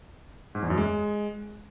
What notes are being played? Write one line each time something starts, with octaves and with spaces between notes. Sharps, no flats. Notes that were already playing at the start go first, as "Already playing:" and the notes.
G#2
E2
F#2
G#3